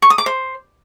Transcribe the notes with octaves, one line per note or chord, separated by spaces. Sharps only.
C#6
D#6
D6
C5